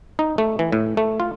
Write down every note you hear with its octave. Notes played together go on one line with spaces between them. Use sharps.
D#4
A3
E3
A2
A3
F4